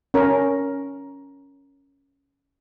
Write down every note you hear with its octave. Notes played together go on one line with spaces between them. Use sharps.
C#4 A#4